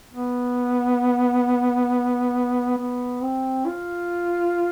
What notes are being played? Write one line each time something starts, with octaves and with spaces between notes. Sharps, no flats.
B3
B3
C4
F4